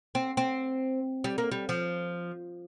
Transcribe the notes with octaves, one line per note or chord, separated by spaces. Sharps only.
C4
C4
G3
A#3
G3
F3